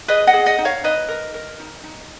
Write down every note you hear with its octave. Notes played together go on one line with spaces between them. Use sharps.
G#4 B4 D#5
D#5 F#5
G#4
D#5 F#5
D#4
C#5 F5
D#4 B4 D#5
A#4
A#4
D#4
D#4